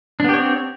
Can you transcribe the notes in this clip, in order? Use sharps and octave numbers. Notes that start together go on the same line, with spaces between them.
B3 C4 D4 G4 C#5